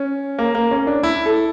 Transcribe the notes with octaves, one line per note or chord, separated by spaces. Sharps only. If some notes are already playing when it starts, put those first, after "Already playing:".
Already playing: C#4
A#3
A#3
C#4
D4
E4
A4